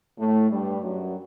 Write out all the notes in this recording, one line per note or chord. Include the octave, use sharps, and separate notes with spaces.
A2 A3
G2 G3
F#2 F#3